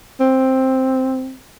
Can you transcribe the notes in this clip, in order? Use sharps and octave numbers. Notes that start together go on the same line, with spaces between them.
C4